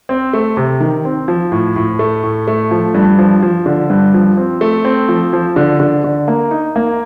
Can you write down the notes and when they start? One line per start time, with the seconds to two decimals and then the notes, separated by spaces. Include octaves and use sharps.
0.09 C4
0.33 A3
0.57 C3
0.80 D#3
1.05 C4
1.28 F3
1.52 A2
1.76 A2
1.99 A3
2.23 A2
2.48 A3
2.71 F3
2.94 G2
3.19 F3
3.43 F3
3.66 D3
3.90 G2
4.14 F3
4.37 C4
4.61 A3
4.85 C4
5.09 F3
5.33 F3
5.56 D3
5.80 D3
6.04 D3
6.28 A#3
6.51 D#4
6.76 A#3